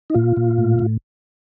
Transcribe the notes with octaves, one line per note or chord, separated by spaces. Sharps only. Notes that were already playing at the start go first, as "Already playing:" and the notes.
D#4
A#2 F4
A#2
A2
A2